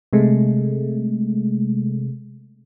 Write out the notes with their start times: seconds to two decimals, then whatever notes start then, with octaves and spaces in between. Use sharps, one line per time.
0.13 C3 G#3 A3